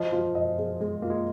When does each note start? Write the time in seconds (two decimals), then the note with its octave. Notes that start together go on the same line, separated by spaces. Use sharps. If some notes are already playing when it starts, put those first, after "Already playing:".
Already playing: F3 D#5
0.12 F4
0.35 D#5
0.58 G#4
0.81 G#3 G#4
1.02 A#3 F4
1.10 G#3